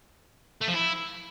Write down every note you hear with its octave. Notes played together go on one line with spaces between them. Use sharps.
A3
F3
E4